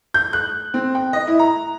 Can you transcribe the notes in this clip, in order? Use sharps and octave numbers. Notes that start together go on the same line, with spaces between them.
G6
F#6
C4
G5
D#5
E4
A#5